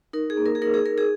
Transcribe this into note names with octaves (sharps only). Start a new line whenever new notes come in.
D#4 A#4
G#4
A#3
A#4
G#4
D#4 A#4
G#4
D#4 A#4
G#4